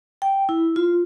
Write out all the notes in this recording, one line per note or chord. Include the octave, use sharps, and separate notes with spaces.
G5
E4
F4